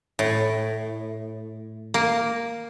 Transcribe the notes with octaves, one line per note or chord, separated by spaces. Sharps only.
A2
A#3